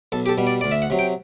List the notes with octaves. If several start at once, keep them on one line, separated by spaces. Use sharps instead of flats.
B1 A4
G4
A4
B2 G3
D5
D2 D5
E5
F#5
C3 F#3
G5